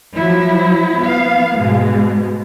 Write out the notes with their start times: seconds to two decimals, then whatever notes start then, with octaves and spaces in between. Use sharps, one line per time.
0.15 F3 F#3 E4
0.98 B3 F5
1.57 G#2 B2 G#3